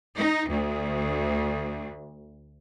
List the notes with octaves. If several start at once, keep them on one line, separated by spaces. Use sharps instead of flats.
D#4
D2